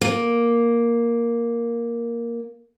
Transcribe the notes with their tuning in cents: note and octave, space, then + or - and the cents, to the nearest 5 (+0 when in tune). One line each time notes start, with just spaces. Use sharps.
A#3 +5